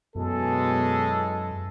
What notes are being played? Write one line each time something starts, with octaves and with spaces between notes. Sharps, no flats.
F#2 B2 E3 F#3 G#3 A4